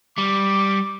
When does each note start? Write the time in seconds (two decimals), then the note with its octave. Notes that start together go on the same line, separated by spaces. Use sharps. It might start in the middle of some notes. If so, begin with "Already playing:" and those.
0.18 G3 D6